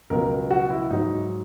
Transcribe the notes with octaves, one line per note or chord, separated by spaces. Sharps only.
C#2 B2 F#3 A#4
F#4
E4
G#2 F#3 D#4